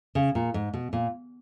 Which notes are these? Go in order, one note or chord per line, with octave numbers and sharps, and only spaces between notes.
C#3
A#2
G#2
B2
A#2